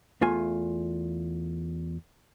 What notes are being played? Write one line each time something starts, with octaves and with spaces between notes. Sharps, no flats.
E2 A3 F4 G#5